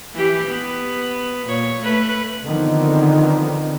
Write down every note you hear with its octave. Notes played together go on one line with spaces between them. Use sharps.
E3 G4
B3
A#2 C#5
A3 B4
D3 D#3 F3 B3 C4